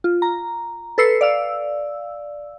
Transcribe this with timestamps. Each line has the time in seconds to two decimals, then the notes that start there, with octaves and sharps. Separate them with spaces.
0.04 F4
0.22 A#5
0.98 A4 B4 E6 C7 C#7
1.21 D5 F5 E6